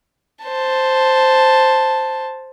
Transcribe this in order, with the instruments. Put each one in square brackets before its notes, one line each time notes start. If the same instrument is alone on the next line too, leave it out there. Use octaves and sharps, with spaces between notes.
[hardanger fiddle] C5 A5